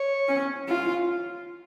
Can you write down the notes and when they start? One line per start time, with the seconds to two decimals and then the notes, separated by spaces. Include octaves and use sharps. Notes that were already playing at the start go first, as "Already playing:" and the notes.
Already playing: C#5
0.28 C#4
0.69 F4